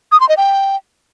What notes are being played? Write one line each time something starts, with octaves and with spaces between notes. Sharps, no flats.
D#6
C6
D#5
G5